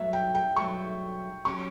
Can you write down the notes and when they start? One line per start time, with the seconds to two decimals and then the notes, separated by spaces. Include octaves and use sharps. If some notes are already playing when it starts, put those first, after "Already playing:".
Already playing: G2 F#3 A3 E5
0.13 G5
0.35 G5
0.56 G2 F#3 A3 C#6
1.45 F#3 C#4 G4 C#6